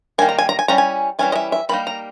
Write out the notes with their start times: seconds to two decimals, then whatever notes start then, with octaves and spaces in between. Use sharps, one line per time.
0.18 D#3 G3 A#3 G#5
0.29 A#5
0.38 G#5
0.49 A#5
0.59 G#5
0.68 G3 C#4 E4 A#5
0.78 G#5
1.19 E3 G3 C#4 E4 G#5
1.32 D#5
1.35 E5
1.52 E5
1.69 D#3 G3 A#3 D#4 B5
1.87 A#5